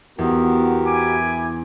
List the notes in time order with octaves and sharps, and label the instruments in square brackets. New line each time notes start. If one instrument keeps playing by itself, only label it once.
[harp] E2 [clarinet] B3 [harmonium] F#4 G4 A#4
[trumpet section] E4 G#5 [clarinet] D6